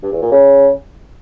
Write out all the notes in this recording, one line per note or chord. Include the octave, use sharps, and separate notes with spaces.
G2
E2
A#2
C#3